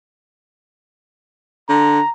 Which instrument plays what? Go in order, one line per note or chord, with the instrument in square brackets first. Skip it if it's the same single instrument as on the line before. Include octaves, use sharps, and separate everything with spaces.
[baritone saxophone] D3 [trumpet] A#5